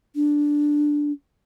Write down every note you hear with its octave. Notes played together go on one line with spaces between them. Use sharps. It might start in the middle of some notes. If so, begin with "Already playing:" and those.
D4